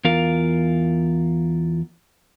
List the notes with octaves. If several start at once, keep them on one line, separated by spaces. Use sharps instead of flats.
E2 F4 A#4 F5